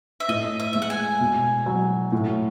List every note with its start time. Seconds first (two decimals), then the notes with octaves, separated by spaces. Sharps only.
0.20 E5
0.28 A2 D#5
0.60 E5
0.73 G#3 E5
0.82 F#5
0.90 G#5
1.20 B2
1.66 F#3
2.12 A2